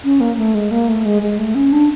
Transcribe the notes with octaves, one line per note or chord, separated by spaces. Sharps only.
C#4
A#3
A3
G#3
A#3
A3
G#3
G#3
A3
C#4
D4